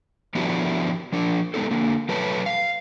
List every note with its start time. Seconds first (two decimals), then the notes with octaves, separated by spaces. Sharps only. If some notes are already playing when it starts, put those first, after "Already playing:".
0.35 F3 B3 D4 E4 F#4 G4
1.12 F3 D4
1.54 G#3 B3 D#4 A4
1.71 D3 A#3
2.09 F#3 A3 B4 C#5 A5
2.46 F5